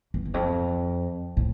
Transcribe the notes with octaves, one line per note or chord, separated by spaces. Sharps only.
E2
E2
F2
A2